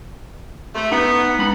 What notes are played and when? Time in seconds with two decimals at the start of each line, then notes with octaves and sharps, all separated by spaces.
0.75 C3 A3
0.92 B3 D#4
1.39 G#3 D4 B5